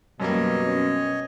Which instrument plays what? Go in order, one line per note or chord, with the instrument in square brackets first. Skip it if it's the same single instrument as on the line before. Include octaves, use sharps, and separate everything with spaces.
[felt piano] F#2 G3 A#3 [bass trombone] B2 [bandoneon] C#5 D#5
[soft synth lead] C#4